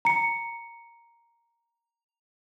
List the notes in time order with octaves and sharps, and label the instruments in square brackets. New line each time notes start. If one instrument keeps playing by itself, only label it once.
[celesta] A#5 C#7